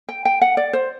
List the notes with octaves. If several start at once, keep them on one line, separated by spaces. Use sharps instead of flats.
G5
G5
F#5
D5
C5